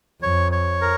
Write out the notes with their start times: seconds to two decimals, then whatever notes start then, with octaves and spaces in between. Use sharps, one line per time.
0.22 F2 C#5
0.52 C#5
0.81 A#4